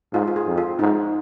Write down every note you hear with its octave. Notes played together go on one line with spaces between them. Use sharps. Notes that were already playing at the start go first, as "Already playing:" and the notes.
G#2 F4
F4
G#4
F2
F4
G#2 D#4